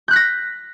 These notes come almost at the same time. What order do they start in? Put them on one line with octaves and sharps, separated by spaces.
G6 F#6 B6 A#6